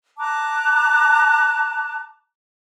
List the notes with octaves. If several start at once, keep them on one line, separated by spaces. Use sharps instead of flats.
A5 A#5 D6 F#6